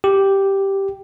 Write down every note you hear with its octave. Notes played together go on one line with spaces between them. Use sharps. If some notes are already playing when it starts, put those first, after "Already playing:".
G4